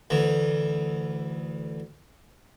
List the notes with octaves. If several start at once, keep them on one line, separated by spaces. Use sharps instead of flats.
D2 E3